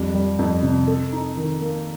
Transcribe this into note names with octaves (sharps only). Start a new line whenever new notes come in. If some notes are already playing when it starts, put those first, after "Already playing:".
Already playing: F2 G3
G3
F2
C3
A4
D#4
D#3
A#3